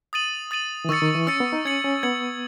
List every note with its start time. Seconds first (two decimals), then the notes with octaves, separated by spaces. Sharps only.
0.13 D#6 A6 D#7 F#7
0.51 D#6 A6 D#7 F#7
0.85 E3
0.89 D#3 C#6 E6 A6 C#7
1.02 D#3
1.15 E3
1.27 C#4 C#6 E6 A6 C#7
1.40 B3
1.53 D#4
1.65 C#4 G#6 C#7 F#7
1.84 C#4
2.03 B3 G#6 C#7 F#7